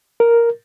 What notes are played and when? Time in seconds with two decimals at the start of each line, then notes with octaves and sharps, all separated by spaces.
0.20 A#4